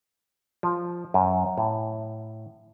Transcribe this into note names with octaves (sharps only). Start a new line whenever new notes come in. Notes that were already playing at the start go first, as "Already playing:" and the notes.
F3
F#2
A2